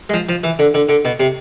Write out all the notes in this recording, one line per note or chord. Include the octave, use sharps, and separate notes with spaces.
G#3
F3
F3
E3
D3
D3
D3
B2
C3